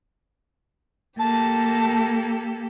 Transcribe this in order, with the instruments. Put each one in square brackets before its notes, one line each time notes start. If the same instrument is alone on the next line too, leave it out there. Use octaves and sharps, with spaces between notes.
[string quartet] A#3 G4 A4 [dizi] A5